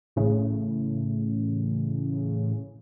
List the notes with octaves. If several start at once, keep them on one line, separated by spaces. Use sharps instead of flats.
A1 A2 C#3